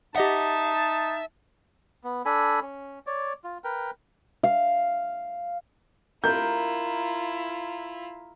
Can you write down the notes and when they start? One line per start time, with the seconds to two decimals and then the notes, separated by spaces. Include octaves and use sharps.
0.16 D#4 G4 D#5 E5 F#5 A5
2.04 B3
2.25 D4 A4 G#5 B5
2.62 C#4
3.07 C#5 D5
3.44 F4
3.64 A#4 B4 G5
4.43 F5
6.24 E4 F4 A#4 G6